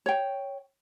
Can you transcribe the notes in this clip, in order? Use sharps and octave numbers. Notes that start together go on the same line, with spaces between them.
C#5 G5